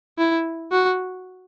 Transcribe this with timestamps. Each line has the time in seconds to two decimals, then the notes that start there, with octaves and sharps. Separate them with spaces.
0.18 E4
0.72 F#4